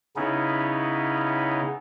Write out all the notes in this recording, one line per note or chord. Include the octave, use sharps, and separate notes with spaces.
C#3 B3 C#4 D#4 E4